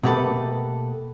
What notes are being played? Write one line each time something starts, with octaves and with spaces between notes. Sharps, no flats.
B2 A3 A#3 G4 A4 B4